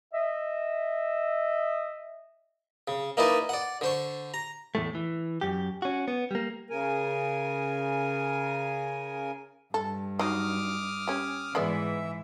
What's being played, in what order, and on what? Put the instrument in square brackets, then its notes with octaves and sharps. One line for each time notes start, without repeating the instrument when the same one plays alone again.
[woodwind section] D#5 E5
[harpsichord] C#3
A#3 D#4 E4 B4 D5 G#5
D5 F#5
D3 C5 C#6
A#5
[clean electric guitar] E2 A2 A3
E3
F#2 G4
C#4 F#4
B3
G3 A#3
[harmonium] C#3 A#4 G#5
[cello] G2 [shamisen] A4
[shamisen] F#3 D#4 [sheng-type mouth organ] D6 D#6 F6
[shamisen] C#4 G4
[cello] G#2 E3 [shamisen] G#3 B3 D5 [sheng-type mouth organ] E5